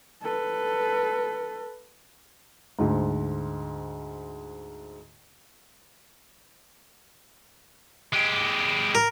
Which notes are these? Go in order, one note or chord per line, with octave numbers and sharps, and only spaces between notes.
A4 B4
D2 G#2
G#3 G4
A#4